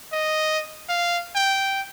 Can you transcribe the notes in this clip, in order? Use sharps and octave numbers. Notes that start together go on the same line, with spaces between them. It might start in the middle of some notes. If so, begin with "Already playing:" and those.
D#5
F5
G5